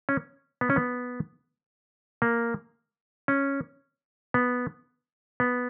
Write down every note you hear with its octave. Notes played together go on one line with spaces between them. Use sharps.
C#4
B3
C#4
B3
A#3
C#4
B3
B3